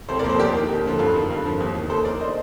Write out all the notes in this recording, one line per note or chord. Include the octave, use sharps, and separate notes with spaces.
C2 A4 C5
A#4 D5
A#2 F3
A4 C5
D#2 G4 A#4
D#3
D#2
D3 F3
G2 F4 A4
D#3
G2
D3 F3
D#2
D#3
D#2 A4 C5
D#3 A#4 D5
C5 D#5